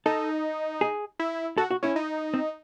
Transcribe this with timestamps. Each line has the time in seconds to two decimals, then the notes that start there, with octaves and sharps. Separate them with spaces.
0.06 D#4 A4
0.81 G#4
1.19 E4
1.58 F#4 A4
1.71 F#4
1.83 C#4 E4
1.96 D#4
2.34 C4